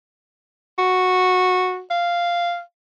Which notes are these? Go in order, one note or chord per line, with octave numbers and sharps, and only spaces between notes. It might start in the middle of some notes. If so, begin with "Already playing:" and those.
F#4
F5